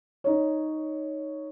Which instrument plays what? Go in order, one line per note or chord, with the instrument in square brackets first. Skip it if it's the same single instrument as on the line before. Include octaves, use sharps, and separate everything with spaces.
[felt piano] D#4 C#5